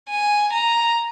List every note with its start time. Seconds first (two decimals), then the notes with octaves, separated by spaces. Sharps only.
0.10 G#5
0.53 A#5